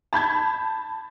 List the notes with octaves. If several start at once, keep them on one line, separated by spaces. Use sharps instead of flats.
A5 B5 G6 G#6